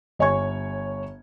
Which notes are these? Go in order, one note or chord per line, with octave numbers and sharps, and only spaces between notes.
G1 C#5 G#5 C#6 G#6